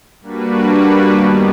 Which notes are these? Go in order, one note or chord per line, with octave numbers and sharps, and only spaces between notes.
G3 A#3 D4 F#4 B4
F#2 D#3 G3 B3